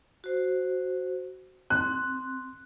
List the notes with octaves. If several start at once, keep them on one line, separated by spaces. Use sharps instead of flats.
F#4 C5
C4 F#6